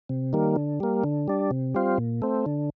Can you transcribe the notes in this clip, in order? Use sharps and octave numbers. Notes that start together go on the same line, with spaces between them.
C3
D#3 G3 A#3
D3
G3 A#3
D3
G3 D4
C3
G3 C4 F4
A#2
A3 C4
D3